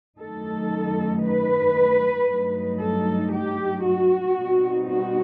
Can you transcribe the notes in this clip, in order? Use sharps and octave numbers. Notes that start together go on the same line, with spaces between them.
F#2 D#3 A3 D#4 A4
B4
G2 F#3 A3 D#4
A4
G4
F#4
B2 G3 C4 D#4
F#4